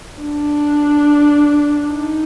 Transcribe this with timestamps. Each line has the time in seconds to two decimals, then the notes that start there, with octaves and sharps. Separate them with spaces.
0.22 D4
1.93 D#4